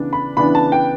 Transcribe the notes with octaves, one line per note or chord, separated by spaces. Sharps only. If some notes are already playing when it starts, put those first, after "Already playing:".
Already playing: C#3 E3 B3 D4
B5
C#3 E3 B3 D4 B5
A5
G5